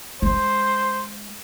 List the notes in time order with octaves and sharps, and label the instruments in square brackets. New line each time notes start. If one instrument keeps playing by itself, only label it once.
[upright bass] G#3 D#4 [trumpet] C5